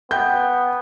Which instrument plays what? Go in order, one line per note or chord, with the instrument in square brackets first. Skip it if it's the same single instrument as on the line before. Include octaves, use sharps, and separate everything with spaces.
[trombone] B3 [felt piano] G5 G6